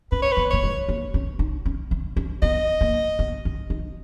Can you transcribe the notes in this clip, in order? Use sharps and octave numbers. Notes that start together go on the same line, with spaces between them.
C#4 B4
C#5
B4
B3
A#3 C#5
G#3
A#3
C#4
D#4
C#4
C#4
C#4
B3 D#5
A#3
B3
C#4
D#4